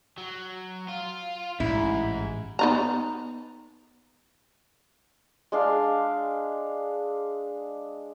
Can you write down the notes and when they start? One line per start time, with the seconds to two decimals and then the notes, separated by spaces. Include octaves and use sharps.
0.18 F#3
0.89 F4
1.60 A1 G#2 E4
2.59 B3 D#4 A#5
5.52 G#3 D4 F5